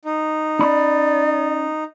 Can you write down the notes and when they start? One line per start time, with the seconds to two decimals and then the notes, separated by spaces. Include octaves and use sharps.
0.05 D#4
0.59 C#4 D5 B5